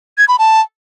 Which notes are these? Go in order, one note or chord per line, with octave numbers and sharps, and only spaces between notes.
G#6
B5
A5